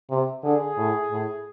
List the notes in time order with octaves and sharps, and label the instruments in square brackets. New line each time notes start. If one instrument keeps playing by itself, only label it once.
[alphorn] C3
[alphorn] D3 [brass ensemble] G#4
[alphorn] A2
A2